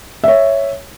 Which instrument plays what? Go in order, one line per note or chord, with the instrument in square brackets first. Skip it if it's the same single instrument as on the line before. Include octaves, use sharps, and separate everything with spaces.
[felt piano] C#5 E5